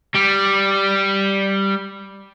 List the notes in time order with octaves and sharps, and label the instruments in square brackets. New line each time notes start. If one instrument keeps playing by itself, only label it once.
[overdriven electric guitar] G3